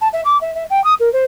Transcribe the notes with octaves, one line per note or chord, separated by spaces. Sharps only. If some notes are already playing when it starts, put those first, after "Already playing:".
A5
E5
D6
E5
E5
G5
D#6
A#4
C5